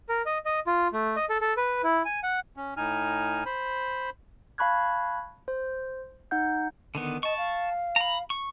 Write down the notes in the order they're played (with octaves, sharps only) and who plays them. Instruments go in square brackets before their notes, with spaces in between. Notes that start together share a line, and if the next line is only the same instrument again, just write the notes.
[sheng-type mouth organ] A#4
D#5
D#5
F4
A3
D#5
A4
A4
B4
E4
G#5
F#5
[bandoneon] C#4
A2 D#4 G#5 F6
C5 B5
[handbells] F5 A5 B5 C#6 F#6 G#6
C5
D#4 F#5 G6
[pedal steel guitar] D3 D#3 B3
[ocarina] D#5 [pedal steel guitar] A5 C#6
[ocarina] F5
[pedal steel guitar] A#5 B5
C#6